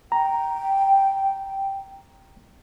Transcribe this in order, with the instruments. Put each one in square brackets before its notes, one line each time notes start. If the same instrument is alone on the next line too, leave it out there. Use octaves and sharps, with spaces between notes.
[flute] G5 [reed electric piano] A#5